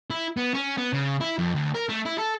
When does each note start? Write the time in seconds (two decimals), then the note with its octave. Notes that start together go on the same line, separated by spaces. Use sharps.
0.10 E4
0.37 B3
0.54 C#4
0.78 B3
0.93 C#3
1.21 E4
1.38 F2
1.55 D2
1.75 A#4
1.89 A3
2.06 E4
2.18 A4